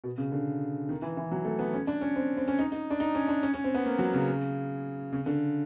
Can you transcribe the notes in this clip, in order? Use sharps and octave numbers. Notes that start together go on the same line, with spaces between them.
B2
C#3
D3
D#3
E3
E3
F#3
A3
B3
C#4
D4
C#4
C4
C4
C#4
D#4
D#4
D4
D#4
C#4
D4
C#4
C#4
C4
B3
A#3
F#3
C#3
C#3
D3